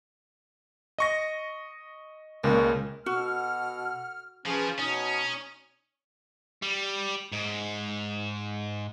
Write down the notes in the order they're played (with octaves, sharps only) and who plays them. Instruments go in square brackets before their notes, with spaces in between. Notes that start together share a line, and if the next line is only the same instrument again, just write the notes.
[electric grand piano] D#5 C#6 A#6
[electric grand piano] C#2 C#3 G#3 [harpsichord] A#2 A#3
[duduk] B2 [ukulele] F#4 [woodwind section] A4 F#5 F6
[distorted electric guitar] F3 [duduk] C#4 [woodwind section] G#4 B4
[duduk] B2 [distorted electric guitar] C#4 [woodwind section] D#4 D#6
[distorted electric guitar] G3
G#2